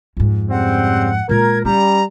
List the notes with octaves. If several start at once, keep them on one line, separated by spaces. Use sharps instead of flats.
F2 G#2
C#3 G3 C4 F#5
A#2 G#3 A#4 G#6
G3 C#4 A#5